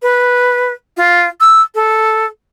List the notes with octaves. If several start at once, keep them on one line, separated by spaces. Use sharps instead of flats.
B4
F4
E6
A4